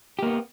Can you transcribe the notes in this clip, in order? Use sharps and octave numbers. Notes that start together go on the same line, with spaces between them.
A#3 B3 G4